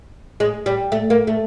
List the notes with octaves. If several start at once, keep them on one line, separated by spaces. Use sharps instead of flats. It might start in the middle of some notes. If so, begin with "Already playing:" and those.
G#3
G3
A3
A#3
A3